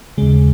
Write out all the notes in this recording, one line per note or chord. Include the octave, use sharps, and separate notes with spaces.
D#2 C#3 G#3